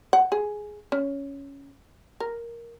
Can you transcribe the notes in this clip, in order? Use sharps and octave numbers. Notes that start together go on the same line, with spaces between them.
F#5
G#4
C#4
A#4